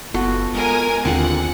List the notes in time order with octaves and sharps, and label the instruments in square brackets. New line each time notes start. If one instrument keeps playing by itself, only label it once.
[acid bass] F#1 [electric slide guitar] B3 F4 A4 [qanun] F#4
[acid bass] G#3 [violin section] A#4 G#5
[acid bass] D#2 [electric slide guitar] D3 [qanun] C4 F4 G#4 [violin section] F#5